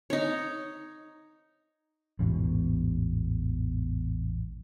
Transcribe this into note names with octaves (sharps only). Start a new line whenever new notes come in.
D#4 C#5
A1 E2 G#2 B2